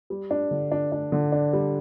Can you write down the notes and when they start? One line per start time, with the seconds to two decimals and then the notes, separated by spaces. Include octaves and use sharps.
0.10 G3
0.31 D4
0.51 D3
0.72 D4
0.92 D4
1.12 D3
1.32 D4
1.53 G3